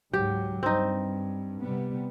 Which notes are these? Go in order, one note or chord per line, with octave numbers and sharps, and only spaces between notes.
C#2 G#2 F#3 G4
G2 C4 D#4
C3 G3 B3